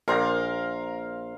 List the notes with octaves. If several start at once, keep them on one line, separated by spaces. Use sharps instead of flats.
A#1 A#4 F5 A#5 C6